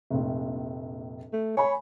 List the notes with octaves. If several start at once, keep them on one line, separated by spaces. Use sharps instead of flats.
F1 A#1
A3
C#5 G#5 B5